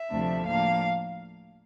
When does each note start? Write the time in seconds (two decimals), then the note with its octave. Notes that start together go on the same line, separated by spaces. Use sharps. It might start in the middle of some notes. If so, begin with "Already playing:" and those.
Already playing: E5
0.11 D2 C3 F3 A3 D4
0.46 A2 F3 A#3 D4 F5